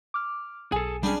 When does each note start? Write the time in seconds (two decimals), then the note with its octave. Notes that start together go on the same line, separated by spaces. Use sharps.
0.14 D6 F6
0.72 B1 G#4 A4 G#5
1.03 G3 C#4 D4 G#4